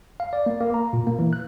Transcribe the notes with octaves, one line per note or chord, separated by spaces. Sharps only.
F5
D5
A#3
A#3
A#5
A#2
A#3
E3
F#6